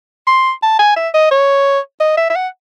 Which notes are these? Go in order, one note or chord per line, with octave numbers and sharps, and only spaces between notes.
C6
A5
G#5
E5
D#5
C#5
D#5
E5
E5
F#5